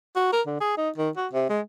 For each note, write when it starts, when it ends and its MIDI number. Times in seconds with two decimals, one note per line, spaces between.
0.16 0.30 66
0.33 0.42 70
0.47 0.57 50
0.61 0.77 68
0.77 0.90 63
0.98 1.10 51
1.17 1.28 66
1.33 1.46 48
1.50 1.61 56